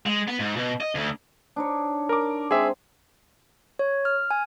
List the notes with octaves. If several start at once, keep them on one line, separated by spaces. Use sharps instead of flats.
G#3
B3
G#2
B2
D#5
D2
D4 D#4 C#5
A#4 D6
G#3 C4 G#4 E5
C#5
F6
G#5